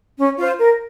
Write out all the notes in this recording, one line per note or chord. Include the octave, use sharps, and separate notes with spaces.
C#4
F4 C5
A#4